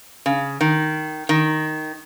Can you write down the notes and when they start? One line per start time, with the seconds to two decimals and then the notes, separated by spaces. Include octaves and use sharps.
0.26 C#3
0.61 D#3
1.29 D#3